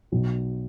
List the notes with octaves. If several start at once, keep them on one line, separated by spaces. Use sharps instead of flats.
B1